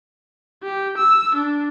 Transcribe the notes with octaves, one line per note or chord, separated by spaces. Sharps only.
G4
E6
D4